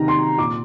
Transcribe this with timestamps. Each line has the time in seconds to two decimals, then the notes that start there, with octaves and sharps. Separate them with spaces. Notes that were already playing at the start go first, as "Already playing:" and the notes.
Already playing: C3 D#3 A#5
0.08 C6
0.38 A#2 D6